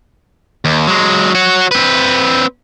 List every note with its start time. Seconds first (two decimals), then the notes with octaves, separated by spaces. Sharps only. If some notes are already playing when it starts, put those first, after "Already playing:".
0.65 D#2
0.87 F#3 G#3
1.35 F#4 C#5
1.71 C4 B4